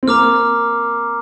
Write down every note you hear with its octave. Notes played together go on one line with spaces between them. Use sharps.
C4
A#3 A#5 D6 F6